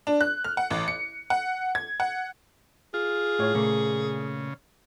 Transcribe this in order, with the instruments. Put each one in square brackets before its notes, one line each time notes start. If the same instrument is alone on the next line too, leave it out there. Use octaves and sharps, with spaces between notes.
[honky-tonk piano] D4
F#6
F6
F#5
A1
C#7
F#5
G#6
F#5
[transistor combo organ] F4 [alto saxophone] G#4
[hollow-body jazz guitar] A2 C#5
[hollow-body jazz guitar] A#2 A3 A#3 [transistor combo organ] C#3